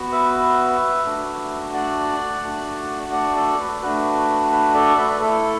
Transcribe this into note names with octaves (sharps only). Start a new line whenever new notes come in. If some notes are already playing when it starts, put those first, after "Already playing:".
Already playing: B3 F#4
B4 E5
A3 D4 F#4
D5 F#5
A3 D4 F#4
D5 F#5
A4 D5
B4
A3 D4 F#4 B4
B4
A4 D5
B4 E5
B4
A3 E4 A4